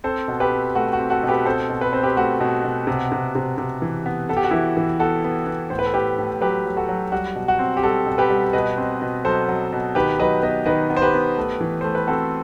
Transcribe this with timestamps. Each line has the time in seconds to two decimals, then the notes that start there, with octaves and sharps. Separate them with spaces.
0.04 C4 A4 C5
0.28 B2
0.40 G4 B4
0.51 C4
0.75 A3 F#4
0.93 F#4
0.99 C4
1.10 F#4 A4
1.23 B2
1.28 G4 B4
1.45 C4 A4 C5
1.69 B2
1.81 B4
1.93 C4 C5
2.03 G4 B4
2.16 A3 F#4
2.40 B2
2.64 B2
2.87 C3
3.12 C3
3.35 C3
3.58 C3
3.82 E3
4.06 B3
4.29 B3 A4
4.37 G4
4.44 F#4
4.51 E3 E4 G4
4.77 E3
4.99 B3 F#4 A4
5.24 B3
5.47 B3
5.70 A2 C5
5.79 B4
5.86 A4
5.94 A2 G4 B4
6.18 A2
6.41 F#3 G4 B4
6.66 F#3
6.77 F#4 A4
6.89 F#3
7.12 G3 F#4
7.35 B2
7.48 F#4
7.59 C4
7.77 G4
7.83 G3 F#4 A4
8.06 B2
8.18 G4 B4
8.30 G3
8.53 B2 B4 D#5
8.77 C4
9.02 B2
9.24 F#3 A4 C5
9.48 F#3
9.72 B2
9.95 D#3 G4 B4
10.19 F#3 B4 D#5
10.42 B3 B4 D#5
10.66 D#3 B4 D#5
10.90 B3
10.97 C5
11.02 G4 B4
11.14 B3
11.37 A3
11.61 E3
11.81 A3 C5
11.95 B4
12.07 C4 F#4 A4